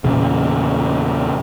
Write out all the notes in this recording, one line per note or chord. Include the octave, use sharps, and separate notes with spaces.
E2 A#2 C#3